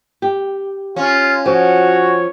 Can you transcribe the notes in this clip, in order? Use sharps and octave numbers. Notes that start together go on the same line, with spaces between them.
G4
C#4 F4
F3 F#4 C#5